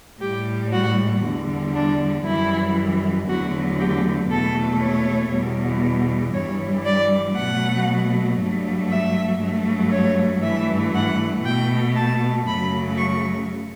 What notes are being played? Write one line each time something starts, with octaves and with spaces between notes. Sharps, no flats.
A2 G3 G4
F#4
E2 D3 G3
D4
F#2 E3 G3 E4
E2 D3 F#3 A3 F#4
G4
E2 B2 A3 A4
C#5
E2 B2 G3
G2 E3 G3 C#5
D5
B2 F#3 A3 F#5
G2 F#3 A3
E5
G2 F#3 A3
C#5
G2 E3 A3 E5
F#5
B2 A3 G5
A5
F#2 C#3 F#3 A3 B5
C#6